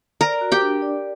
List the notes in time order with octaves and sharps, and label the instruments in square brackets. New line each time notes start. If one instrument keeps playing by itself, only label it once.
[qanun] A#4 A#5 [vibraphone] D5
[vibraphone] F#4
[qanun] G4 G5
[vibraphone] D4
D5